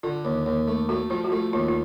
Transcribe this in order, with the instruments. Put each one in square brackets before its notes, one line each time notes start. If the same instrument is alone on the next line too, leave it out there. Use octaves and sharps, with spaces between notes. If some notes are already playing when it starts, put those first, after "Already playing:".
[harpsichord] D3 [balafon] F4
[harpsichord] D#2
D#2
A3
[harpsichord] A3 [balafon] F#4
[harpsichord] F3 [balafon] F4
[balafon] F#4
[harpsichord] A3 [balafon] F4
[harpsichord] D#2 [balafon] F4
[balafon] F4